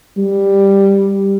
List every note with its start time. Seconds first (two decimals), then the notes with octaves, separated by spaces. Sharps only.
0.17 G3